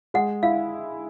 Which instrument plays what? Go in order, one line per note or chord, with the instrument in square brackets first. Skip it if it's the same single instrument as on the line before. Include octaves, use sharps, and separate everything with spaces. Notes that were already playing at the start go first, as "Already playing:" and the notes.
[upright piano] G#3 [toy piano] F#5
[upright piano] E4 [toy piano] F5